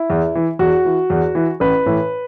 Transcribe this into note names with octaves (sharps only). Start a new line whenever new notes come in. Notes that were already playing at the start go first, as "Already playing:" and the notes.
Already playing: E4
E2
E3
E2 F#4
E3
E2
E3
A1 B4
A2 E3